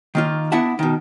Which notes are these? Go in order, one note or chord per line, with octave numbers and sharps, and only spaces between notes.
D#3 A#3 F4
B3 D4 E4 E5 F#5 A5
B2 D#3